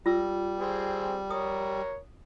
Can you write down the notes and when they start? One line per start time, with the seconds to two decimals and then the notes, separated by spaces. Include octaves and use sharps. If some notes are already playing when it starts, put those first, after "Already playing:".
0.06 G3 F4 E6
0.60 C4 G#4
1.31 A#4 C#5 D#6